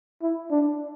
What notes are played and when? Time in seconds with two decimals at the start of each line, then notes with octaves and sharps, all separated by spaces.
0.22 E4
0.51 D4